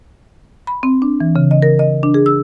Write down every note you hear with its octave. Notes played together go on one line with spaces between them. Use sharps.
B5
C4
D4
E3
C#3
D#5
A#4
D#5
D4
G#4
E6